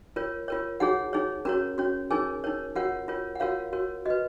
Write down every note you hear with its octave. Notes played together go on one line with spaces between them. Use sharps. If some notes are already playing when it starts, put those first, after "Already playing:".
F4 A#4 C#5
F4 A#4 C#5
D#4 F#4 G#4 C#5 F#5
D#4 G#4 C#5
C#4 F#4 A#4 C#5 A#5
C#4 F#4 C#5
D#4 G#4 A#4 C#5 G#5
D#4 A#4 C#5
F4 F#4 A#4 C#5 F#5
F4 A#4 C#5
F#5
F4 F#4 A#4 C#5 F5
F#4 A#4 C#5
F#4 B4 D#5